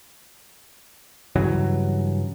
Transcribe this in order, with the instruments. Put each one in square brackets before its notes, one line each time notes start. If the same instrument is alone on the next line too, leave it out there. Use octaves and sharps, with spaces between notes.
[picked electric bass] G2 C#3 E3 F#3